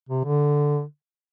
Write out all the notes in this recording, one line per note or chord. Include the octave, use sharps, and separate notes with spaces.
C3
D3